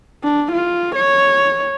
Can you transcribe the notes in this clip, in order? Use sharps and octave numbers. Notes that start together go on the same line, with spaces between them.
D4
F4
C#5